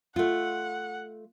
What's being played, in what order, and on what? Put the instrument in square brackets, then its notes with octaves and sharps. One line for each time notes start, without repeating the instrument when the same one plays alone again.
[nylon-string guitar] A3 F4 [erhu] F#5